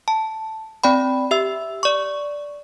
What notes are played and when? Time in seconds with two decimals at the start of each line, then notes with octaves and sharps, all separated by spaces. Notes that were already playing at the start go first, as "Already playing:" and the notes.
0.08 A5
0.84 C4 D5 G5 B5
1.31 G4 E5 E6
1.83 D5 C#6